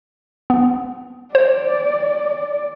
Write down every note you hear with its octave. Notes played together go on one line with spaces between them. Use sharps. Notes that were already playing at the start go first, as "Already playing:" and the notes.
B3
C5 D5